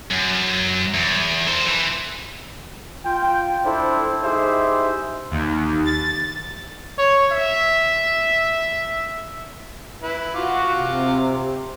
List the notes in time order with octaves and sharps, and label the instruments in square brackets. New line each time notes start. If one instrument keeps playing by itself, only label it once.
[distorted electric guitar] F#2
E2
A4 C5
E3
[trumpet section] F4 G5
D4 E4 A4 C5
D#4 E4 G4 G#4 C5 E5
[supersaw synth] D#2
A6
[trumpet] C#5
E5
[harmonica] E4 B4
[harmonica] F4 D6 [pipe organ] F#4
[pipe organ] C3